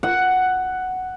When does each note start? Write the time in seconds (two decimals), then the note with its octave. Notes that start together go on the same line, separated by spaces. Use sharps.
0.03 F#5